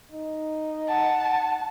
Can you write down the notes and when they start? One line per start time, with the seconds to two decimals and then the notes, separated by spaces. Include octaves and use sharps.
0.12 D#4
0.89 F#5 A5